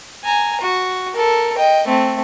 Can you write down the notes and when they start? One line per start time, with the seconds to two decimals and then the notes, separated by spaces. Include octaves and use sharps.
0.25 G#5 A#5
0.61 F#4
1.14 A4 A#4
1.57 D#5 G5
1.88 A3 C4